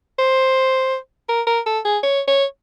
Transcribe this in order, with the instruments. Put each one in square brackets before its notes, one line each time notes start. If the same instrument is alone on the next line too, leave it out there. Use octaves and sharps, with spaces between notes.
[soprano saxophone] C5
A#4
A#4
A4
G#4
C#5
C#5